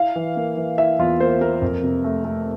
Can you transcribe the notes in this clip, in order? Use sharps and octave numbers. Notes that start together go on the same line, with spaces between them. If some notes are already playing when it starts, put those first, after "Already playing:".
Already playing: E4 F5
E3
A#3
E3
E4 E5
E2 F4
A#3 C5
A#3 A#4
F2
C3
A3
A3